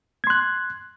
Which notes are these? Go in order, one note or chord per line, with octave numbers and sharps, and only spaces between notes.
C6 F#6 G#6